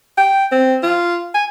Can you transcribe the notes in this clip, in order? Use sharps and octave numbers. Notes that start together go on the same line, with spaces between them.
G5
C4
F4
G#5